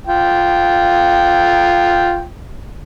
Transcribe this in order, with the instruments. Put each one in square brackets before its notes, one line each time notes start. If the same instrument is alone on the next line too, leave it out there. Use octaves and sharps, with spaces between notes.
[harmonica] F4 G5